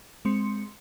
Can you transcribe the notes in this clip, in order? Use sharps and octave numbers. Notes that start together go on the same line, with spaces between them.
G#3 C4 C6 C#7